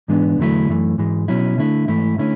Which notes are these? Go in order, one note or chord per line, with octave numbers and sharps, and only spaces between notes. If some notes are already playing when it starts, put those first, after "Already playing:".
G#2 E3 G#3 B3 D4
E2 D3 F#3 A3 E4
F#2 E3 A3
G#2 E3 G#3
B2 F#3 C#4 E4
D3 A3 E4
G#2 E3 A3 E4
D3 A3 C#4 E4